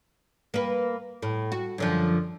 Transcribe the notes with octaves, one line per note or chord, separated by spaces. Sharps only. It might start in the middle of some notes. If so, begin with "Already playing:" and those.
A#3 B4
A2
F#4
F#2 D3 F3